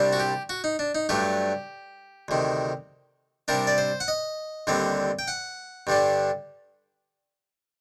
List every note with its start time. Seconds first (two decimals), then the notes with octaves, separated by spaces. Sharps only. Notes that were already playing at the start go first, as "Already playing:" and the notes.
Already playing: C2 C3 G3 D4
0.13 F#4
0.20 G4
0.49 F#4
0.64 D#4
0.79 D4
0.95 D#4
1.09 G2 F#3 A3 D4 G4
2.28 D2 C3 D#3
3.48 C3 G3 D4 A#4
3.67 D5
3.78 C5
4.00 F#5
4.08 D#5
4.67 D#2 D3 G3 C4
5.19 G5
5.28 F#5
5.87 G2 D3 G3 D4